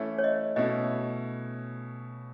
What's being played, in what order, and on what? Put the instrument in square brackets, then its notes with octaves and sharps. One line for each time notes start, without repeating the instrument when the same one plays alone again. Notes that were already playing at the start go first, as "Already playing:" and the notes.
Already playing: [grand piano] E3 A3 C#4 E4
[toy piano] C#5
D#5
[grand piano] B2 A3 C#4 E4 [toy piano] D#5